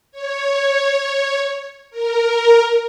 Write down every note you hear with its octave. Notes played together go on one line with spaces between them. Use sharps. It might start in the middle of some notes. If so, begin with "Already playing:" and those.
C#5
A#4